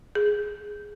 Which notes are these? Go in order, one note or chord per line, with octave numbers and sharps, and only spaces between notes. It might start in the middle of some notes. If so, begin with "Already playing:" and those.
G#4